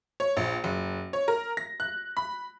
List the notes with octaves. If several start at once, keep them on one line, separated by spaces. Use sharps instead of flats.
C#5
A#1
F#1
C#5
A#4
A#6
F#6
B5